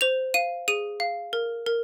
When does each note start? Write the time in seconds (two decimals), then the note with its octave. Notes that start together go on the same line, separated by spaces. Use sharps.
0.01 C5 F7
0.34 F5 D#7
0.68 G#4 D#7
1.00 F5
1.33 A#4
1.66 A#4